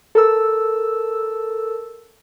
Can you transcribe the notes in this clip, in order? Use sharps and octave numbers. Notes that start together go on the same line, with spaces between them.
A4 A#4 E6